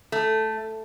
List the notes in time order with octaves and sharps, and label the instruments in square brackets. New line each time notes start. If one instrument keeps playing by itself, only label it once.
[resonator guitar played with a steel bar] A3